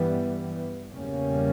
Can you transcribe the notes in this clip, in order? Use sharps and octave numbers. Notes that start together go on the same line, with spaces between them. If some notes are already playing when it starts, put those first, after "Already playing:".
Already playing: G2 E3 G3 B3
E2 C#3 G3 A#3 C#4